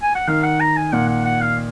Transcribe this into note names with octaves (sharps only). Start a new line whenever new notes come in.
G#5
F#5
D#3 F5
F#5
A#5
G#5
A#2 F#5
F#5
F#5
F5